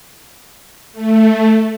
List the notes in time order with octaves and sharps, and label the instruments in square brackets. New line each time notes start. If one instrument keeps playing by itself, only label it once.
[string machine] A3